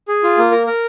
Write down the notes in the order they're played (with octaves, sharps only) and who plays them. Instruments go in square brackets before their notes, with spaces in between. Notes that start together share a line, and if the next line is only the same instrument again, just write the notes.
[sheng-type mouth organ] G#4
F4
A#3
A#4
A#4